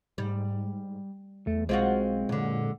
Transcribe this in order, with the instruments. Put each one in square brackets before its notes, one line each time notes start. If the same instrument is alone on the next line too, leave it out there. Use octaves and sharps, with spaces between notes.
[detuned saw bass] G#2 [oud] G3
[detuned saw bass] E2 [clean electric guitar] A3
[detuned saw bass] B1 [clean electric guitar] G#3 [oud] C4 F4 F#4
[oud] F#2 D3 [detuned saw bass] A#2